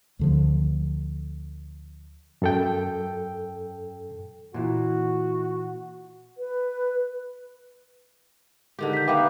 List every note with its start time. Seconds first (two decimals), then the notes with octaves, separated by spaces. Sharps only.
0.19 D2 D3 F3
2.42 F#2 A4 G5
4.54 A#2 E3 F#4
6.38 B4
8.79 D3 D#3 G4
8.93 G6 B6
9.08 A#3 B3 B4 E5 G5 D6